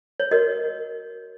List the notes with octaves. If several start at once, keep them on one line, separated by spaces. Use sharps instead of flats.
C#5
F#4 A#4 C#5 D#5